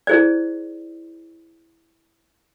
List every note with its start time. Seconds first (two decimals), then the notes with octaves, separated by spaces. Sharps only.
0.07 E4 G#4 C5 D5